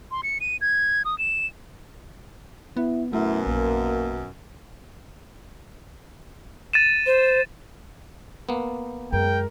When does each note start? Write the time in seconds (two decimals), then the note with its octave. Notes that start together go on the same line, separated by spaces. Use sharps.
0.11 C6
0.23 C#7
0.41 D#7
0.61 G#6
1.05 D#6
1.18 E7
2.77 B3 E4
3.13 F#2 B2 A3 E4
3.47 A#1 A#3
6.73 A6 D#7 E7
7.06 C5
8.49 A#3 B3
9.13 F#2 F#3 G#3 A#4 G5